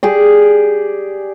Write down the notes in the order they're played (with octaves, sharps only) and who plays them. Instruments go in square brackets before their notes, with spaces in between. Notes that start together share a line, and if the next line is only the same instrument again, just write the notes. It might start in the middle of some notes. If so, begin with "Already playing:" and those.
[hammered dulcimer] G4 G#4 D5